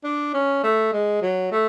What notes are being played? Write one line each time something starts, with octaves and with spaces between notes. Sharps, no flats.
D4
C#4
A3
G#3
F#3
A3